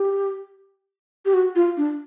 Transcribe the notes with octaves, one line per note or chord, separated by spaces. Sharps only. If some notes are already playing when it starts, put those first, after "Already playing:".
Already playing: G4
G4
F#4
F4
D4